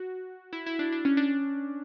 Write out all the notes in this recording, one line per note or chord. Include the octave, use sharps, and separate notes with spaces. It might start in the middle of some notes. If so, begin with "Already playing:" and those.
Already playing: F#4
E4
E4
D4
D4
C#4
D4